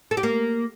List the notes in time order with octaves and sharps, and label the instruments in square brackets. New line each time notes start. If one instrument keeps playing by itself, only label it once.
[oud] A4
G4
A#3